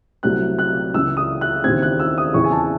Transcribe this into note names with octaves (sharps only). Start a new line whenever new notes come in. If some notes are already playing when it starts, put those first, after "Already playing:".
C2 C3 F#3 A3 C4 F#6
F#6
C#2 C#3 E3 E6
D#6
F#6
D#2 C#3 E3 C4 G#6
F#6
E6
D#6
E2 C#3 E3 C4 E4 C#6
G#5
A5